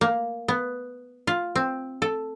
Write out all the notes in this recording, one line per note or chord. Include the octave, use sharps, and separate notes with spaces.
A#3
B3
F4
C4
A4